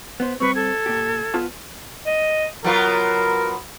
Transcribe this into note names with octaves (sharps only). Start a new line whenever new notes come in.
B3 C5
G3 C4 B4 C#6
A4 G#6
A#2 G4
B3 F4 A5
D#5
F#3 B3 F4 A#4